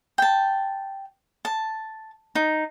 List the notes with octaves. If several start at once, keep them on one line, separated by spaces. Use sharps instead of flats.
G5 A5
A5
D#4